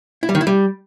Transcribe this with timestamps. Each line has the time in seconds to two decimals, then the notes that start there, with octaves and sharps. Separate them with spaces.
0.23 E4
0.29 G3
0.35 D#3
0.41 E4
0.47 G3